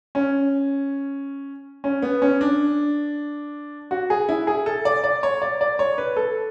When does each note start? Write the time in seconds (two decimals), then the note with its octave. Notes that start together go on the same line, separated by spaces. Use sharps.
0.15 C#4
1.84 C#4
2.02 B3
2.22 C#4
2.41 D4
3.91 F#4
4.10 G#4
4.29 E4
4.47 G#4
4.66 A4
4.85 D5
5.04 D5
5.23 C#5
5.42 D5
5.61 D5
5.79 C#5
5.98 B4
6.17 A4